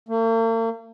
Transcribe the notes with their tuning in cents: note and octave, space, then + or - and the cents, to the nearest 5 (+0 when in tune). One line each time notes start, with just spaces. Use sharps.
A#3 -45